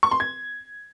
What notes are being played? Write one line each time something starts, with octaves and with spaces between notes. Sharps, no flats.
C#6
C6
G#6